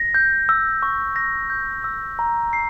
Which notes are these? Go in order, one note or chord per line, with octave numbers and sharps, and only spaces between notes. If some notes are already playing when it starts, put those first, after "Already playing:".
Already playing: A#6
G6
E6
C#6
A#6
G6
E6
A#5
C7